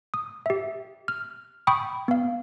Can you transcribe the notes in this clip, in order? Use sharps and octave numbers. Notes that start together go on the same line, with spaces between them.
D#6
G4 E5
F6
G5 B5 C#6 D#6
B3 F5